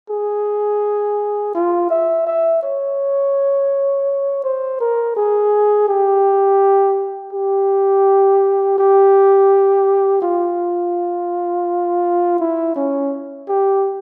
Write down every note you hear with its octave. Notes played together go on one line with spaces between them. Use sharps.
G#4
F4
E5
E5
C#5
C5
A#4
G#4
G4
G4
G4
F4
E4
C#4
G4